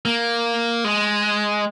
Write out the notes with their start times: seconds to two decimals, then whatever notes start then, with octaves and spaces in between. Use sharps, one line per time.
0.05 A#3
0.84 G#3